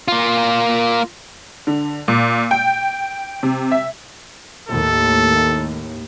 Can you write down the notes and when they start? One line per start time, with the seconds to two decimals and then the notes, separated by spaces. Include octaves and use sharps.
0.08 A#3 F4
1.67 D3
2.08 A#2
2.51 G5
3.43 C3
3.71 E5
4.69 D#2 A2 A4